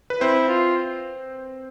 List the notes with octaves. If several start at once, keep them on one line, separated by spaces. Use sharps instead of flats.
B4
C4 E4 C5
F4